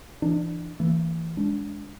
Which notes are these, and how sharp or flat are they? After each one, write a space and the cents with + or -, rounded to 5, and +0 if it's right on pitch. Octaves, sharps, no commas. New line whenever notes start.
E3 +30 D4 +30
E3 +0 A#3 -45
G#3 +0 D4 -20